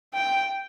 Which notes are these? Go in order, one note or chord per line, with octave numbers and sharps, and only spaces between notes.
G5